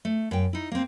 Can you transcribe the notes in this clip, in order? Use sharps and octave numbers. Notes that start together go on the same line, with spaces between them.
A3
F#2 G5
D#4 E4
A#3 C4